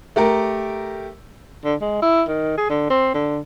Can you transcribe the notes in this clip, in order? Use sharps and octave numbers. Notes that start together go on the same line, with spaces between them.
A3 G4 A#4
D3
G#3
E4
D#3
G#4
D3
C4
D3